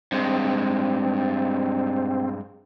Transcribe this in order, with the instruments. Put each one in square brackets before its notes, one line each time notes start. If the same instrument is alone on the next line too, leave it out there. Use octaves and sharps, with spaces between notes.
[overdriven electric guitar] G2 G#3 [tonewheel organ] C4